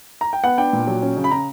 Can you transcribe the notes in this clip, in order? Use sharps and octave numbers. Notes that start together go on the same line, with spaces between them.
A#5
G5
B3 F#5
D4 G5
A#2
F#3
C#4
C#3
B5
C#3 A#5